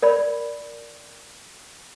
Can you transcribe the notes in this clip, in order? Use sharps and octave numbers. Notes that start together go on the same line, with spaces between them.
A#4 D5 B5